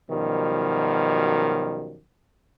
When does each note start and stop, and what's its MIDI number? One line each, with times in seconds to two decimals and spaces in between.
0.11 1.99 42
0.11 1.99 47
0.11 1.99 51
0.11 1.99 53
0.11 1.99 55